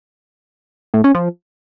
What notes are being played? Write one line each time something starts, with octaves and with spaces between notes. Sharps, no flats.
A2
C#4
F3